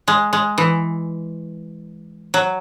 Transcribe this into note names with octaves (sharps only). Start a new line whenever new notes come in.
G#3
G#3
E3
F#3